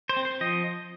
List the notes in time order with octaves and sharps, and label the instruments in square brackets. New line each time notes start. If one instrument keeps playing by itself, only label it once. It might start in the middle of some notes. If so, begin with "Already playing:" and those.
[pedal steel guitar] C5
C4
C5
F3 D#5